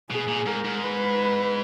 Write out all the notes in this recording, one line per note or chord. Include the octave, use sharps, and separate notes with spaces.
B2 G#4
A#2
G#2 A#4
G#2
B4